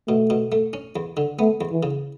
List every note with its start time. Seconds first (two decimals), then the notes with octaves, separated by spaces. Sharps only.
0.08 B2 A3
0.30 B2
0.52 A3
0.73 C#4
0.96 E2
1.17 D3
1.39 A3 B3
1.61 E2
1.71 E3
1.83 C#3